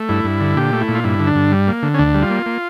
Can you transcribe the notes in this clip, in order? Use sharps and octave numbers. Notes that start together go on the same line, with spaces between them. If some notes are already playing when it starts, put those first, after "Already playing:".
Already playing: A3
G2 E4
G2
D3
A#2 G4
A3
E4
A#2
F4
G2 E4
D3
D4
G2
G3
A#3
D3
C#4
D2 D4
G3
F4
A#3
A#3